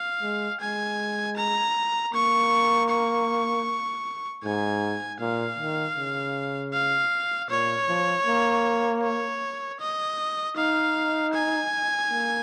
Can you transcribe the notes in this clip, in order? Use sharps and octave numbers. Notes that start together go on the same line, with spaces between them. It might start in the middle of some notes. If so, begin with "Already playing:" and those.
Already playing: F5
G#3
G#3 G#5
A#5
A#3 C#6
C#6
G#2 G#5
A#2 F5
D#3
C#3
F5
A#2 C#5
F3
A#3
C#5
D#5
D#4 F5
G#5
A#3